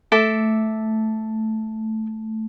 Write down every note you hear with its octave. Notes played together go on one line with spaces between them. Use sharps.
A3 A4 E5 D6